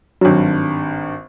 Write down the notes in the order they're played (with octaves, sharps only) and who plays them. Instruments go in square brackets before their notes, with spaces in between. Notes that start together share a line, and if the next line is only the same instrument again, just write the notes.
[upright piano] G#1 G2 [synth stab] F#3